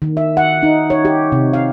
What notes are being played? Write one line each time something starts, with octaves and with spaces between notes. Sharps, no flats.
D#3
E5
F#5
D#4
C#5
G4
C3
F5